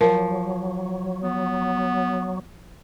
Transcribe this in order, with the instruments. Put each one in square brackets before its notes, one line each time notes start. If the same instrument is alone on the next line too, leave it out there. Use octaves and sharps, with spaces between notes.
[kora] F3 [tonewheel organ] F#3 [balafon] A#4
[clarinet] B3